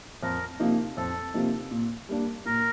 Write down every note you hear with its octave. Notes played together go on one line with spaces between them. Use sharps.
F2 A#4
C3 F3 A#3 D#4
F2 A4
C3 F3 A#3 D#4
A#2
G3 A#3 D4
A#2 A#4